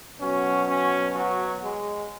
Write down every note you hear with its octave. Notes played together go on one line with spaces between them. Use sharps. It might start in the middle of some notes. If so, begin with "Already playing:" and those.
B2 F#3 C#4
C#4
F#3
G#3